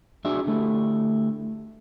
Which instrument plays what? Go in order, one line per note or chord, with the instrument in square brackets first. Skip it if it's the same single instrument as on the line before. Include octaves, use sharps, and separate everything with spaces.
[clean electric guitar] D4 F#4 G#4 D5 E5
D3 A3 E4 G4